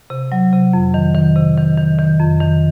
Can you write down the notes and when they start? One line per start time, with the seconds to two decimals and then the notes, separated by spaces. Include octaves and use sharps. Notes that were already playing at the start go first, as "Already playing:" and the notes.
0.10 C3
0.32 F#3
0.53 C3
0.73 F2
0.94 D#3
1.15 D#3
1.36 C3
1.57 D#3
1.78 D#3
1.99 D#3
2.20 F2
2.41 D#3